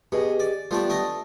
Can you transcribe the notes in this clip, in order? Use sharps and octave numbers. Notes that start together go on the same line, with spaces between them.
B2 G4 G#4 D#5
D5
F3 G3 A3 B3 G4 D5
A3 D4 D#5